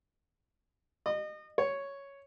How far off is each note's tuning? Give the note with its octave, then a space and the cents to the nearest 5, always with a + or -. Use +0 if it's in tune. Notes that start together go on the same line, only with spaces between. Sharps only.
D#5 -30
C#5 +0